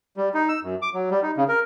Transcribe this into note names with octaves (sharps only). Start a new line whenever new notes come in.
G3
D#4
E6
F#2
D6
F#3
G3
D#4
C#3
A#4